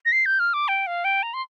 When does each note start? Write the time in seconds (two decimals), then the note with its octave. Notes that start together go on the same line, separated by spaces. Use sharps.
0.06 A#6
0.12 C7
0.26 G6
0.40 F6
0.54 D6
0.68 G5
0.87 F5
1.05 G5
1.23 A#5
1.34 C6